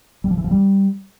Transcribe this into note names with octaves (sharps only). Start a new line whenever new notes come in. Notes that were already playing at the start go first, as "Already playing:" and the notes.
G3
F3
E3
F3
G3